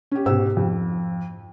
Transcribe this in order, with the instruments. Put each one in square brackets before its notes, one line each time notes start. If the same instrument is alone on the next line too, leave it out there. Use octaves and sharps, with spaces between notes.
[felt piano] C#4 G4
[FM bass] G#2 [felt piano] B2 G4 E6
[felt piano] F2